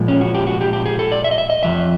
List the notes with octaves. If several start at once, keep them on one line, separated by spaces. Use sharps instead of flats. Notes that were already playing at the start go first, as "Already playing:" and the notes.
Already playing: A#2 F3 G#3
C#4
F#4
G4
F#4
G4
G4
G#4
A4
D5
E5
D#5
E5
D#5
F2 C3 F3 E5